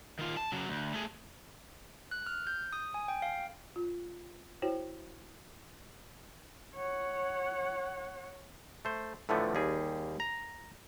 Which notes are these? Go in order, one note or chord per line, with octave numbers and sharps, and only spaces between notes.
D#3 F4
A5
C#3 F#3
D2
A3 G#4
F#6
F6
G6
D#6
G#5
G5
F5
F4
E4 F#4 C5 C#5 G5
C#5 F#5
A3 C5
A2 D3 E3 F3 A3 B3
D#2 G3 G#4
A#5